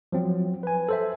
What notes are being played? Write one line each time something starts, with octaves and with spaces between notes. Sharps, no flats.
F3 F#3 C4
B4 G#5
A4 C5 E5